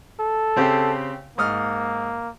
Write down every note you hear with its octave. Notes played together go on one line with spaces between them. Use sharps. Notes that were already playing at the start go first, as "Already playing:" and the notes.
A4
C#3 C4 G4
G#2 A#3 D#6 F6